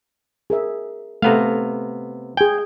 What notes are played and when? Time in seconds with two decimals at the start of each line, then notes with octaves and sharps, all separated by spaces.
0.50 G#4 A#4 E5
1.22 C3 A3 B3 F5 A#5
2.37 G#4 G5 G#5